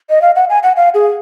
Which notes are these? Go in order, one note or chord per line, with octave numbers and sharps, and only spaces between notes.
D#5
F5
F#5
G#5
F#5
F5
G#4